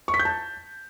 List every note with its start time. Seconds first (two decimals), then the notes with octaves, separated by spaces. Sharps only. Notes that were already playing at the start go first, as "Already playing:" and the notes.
0.08 C#6
0.14 B6
0.20 G6
0.25 A5